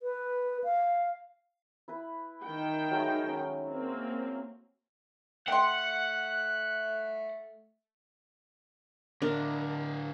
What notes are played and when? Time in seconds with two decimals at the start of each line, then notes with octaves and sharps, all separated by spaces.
0.02 B4
0.64 F5
1.88 E4 B4
2.43 D#3 G5
2.91 F#3 G#3 A3
3.28 C#4
3.71 A#3 C4
5.48 A3 F#5 G5 C6 F#6
9.22 A2 D3 D4 A#4